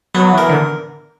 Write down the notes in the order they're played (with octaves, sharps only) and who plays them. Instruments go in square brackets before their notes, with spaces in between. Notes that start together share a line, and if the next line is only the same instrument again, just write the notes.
[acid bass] F#3 [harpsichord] B3
[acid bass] E3
[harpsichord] A#4
[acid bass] D3